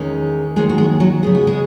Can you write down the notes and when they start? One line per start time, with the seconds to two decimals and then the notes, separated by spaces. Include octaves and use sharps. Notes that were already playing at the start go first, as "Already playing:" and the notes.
Already playing: E2 D#3 G#3 C#4
0.56 D#2 D#3 F#3 G#3 G#4
0.69 F#4
0.78 G#3 G#4
1.00 F#3 F#4
1.23 C#3 G#3 B3 G#4
1.35 F#4
1.47 G#3 G#4